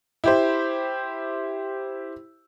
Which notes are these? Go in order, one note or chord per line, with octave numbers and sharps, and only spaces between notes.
E4 G4 C5